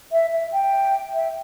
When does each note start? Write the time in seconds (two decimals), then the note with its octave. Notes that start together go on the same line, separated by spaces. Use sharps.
0.12 E5
0.32 E5
0.53 G5
1.14 E5